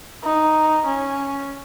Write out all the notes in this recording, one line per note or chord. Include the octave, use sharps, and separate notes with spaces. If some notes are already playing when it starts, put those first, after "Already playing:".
D#4
C#4